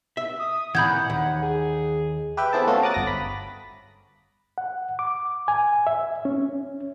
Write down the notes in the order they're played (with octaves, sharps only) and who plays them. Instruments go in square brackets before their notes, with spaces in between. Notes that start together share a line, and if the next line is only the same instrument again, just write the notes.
[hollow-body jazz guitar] E5
[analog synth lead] D#6
[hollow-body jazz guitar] A#2 E3 [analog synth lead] F#5 [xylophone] B5 G6 G#6
[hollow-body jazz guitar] D#2
[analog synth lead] G#4
[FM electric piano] G4 B4 E5 G5
B3 C4 E4 G#4 A4 A5
A3 C#4 F4 F#4 A4 A5
A#5 D6 D#6 F#6 A6
G1 A#6
B5
[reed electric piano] F#5
D6
G#5
E5
C#4